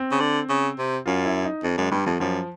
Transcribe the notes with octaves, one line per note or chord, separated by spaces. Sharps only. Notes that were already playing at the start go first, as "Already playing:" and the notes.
Already playing: C4
C#3
D3
C#3
C3
F#2 F4
E4
D#4
F2
F#2 G#3
G2 G3
F2 F3
F#2 F3